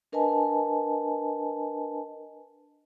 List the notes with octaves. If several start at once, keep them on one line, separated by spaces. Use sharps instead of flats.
D4 A#4 B4 D#5 G#5 A5